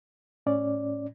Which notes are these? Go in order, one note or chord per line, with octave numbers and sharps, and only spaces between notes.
A2 C#4 D5